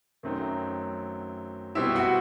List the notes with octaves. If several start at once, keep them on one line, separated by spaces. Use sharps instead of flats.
F#2 D#3 F#3 A3 C4
B2 G3 C4 E4 E5
F#4 F#5